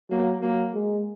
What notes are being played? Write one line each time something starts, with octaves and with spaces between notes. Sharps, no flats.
F#3 A#3
F#3 A#3
G#3